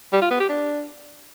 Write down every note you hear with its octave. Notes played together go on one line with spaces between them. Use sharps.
G3
F4
B3
G4
D4